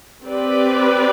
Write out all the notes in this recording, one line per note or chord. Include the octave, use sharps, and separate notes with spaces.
C4 G4 B4 D5